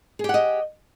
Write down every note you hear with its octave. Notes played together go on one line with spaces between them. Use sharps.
G4 G#4 D#5 F#5